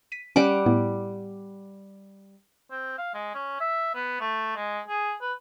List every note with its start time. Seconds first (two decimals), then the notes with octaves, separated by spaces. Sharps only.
0.12 B6 D#7
0.36 G3 C#4 F#5 D6
0.66 A2 B3 E4
2.71 C4
2.98 F5
3.14 G#3
3.34 C#4
3.60 E5
3.95 B3
4.20 A3
4.56 G#3
4.88 G#4
5.21 B4